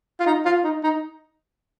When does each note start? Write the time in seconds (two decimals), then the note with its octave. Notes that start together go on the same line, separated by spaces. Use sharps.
0.19 F4
0.26 D#4
0.45 F4
0.64 D#4
0.83 D#4